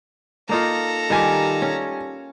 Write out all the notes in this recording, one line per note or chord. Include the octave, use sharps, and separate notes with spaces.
A#3 D#4 F4 A4 A#5
D#3 G3 F4 G4 G#5
C#4